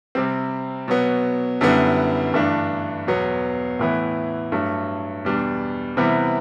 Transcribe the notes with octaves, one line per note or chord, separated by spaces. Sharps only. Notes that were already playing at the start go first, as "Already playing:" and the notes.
C3 G3 C4
B2 F#3 B3
F#2 D3 G3 B3 E4
G2 E3 A3 D4
E2 B2 F#3 B3
A2 E3 B3 E4
G2 F#3 A3
E2 B2 G3 D4
C3 E3 G3 B3 E4